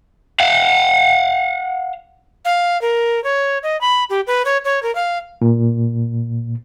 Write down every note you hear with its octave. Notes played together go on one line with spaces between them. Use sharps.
F5 F#5
F5
A#4
C#5
D#5
B5
G4
B4
C#5
C#5
A#4
F5
A#2